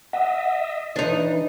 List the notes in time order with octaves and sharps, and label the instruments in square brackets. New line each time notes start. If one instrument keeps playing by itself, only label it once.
[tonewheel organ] D#5 E5 [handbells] F#5
[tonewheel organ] E3 [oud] D4 D#4